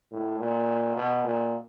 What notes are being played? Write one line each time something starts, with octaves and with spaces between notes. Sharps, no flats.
A2
A#2
B2
A#2